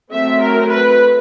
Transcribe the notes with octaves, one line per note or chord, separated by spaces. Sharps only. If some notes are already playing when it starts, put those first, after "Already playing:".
F#3 A3 C4 E5
A#4
B4